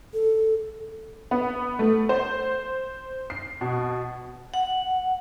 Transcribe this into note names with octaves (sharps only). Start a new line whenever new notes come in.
A4
B3
A3
C5
C7
B2
F#5